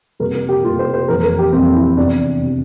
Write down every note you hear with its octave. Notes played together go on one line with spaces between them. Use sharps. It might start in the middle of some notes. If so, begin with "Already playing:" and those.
C3 G3 A#3 A#4
A#4
G4
C3 G3 A#3 F4
C5
C5
F2 E3 G3 A#3 A#4
A#4
G4
F2 E3 G3 A#3 C4
E4
E2 C3 E3 D4
C3 E3